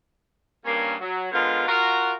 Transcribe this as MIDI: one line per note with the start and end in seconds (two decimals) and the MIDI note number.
0.65 0.95 43
0.65 0.95 58
0.65 0.95 61
1.01 1.28 54
1.32 1.65 50
1.32 1.65 56
1.32 1.65 59
1.32 1.65 65
1.32 1.65 70
1.67 2.14 65
1.67 2.14 66
1.67 2.14 70